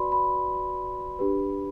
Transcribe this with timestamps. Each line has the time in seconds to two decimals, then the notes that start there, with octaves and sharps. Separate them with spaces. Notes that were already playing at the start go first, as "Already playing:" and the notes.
Already playing: F#4 B4 D5 B5 C6
0.12 B5
1.19 D4 G4 B4